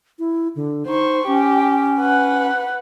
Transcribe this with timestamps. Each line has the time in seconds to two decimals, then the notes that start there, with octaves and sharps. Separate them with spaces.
0.19 E4
0.56 D3
0.87 D#4 C5 C#6
1.27 C#4 G4
2.01 B4 F#5